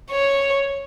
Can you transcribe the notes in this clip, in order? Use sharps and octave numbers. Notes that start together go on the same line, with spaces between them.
C#5